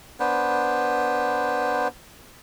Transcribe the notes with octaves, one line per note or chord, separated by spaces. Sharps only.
B3 D4 B4 C5